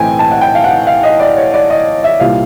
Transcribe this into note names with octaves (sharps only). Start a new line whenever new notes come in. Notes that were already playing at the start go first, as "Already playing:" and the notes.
Already playing: B1 A2 E3 A3 C4 G5 G#5
A5
F#5
G5
F5
F#5
F5
D#5
D5
C#5
D5
D#5
E5
C2 A#2 G3 F5